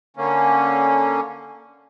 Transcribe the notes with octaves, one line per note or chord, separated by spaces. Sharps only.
D3 A#3 C#4